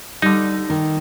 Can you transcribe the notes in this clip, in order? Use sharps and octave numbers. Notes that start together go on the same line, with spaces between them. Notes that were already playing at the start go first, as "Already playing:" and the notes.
D3 G3 D#4
D#3 A#4